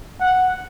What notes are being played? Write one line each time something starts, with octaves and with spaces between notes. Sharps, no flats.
F#5